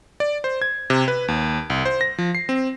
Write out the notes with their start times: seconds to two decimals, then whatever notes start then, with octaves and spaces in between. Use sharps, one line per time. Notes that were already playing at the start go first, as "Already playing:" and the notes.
0.20 D5
0.44 C5
0.62 G#6
0.90 C3
1.08 B4
1.28 D#2
1.70 C2
1.85 C5
2.01 A#6
2.18 F3
2.35 C7
2.49 C4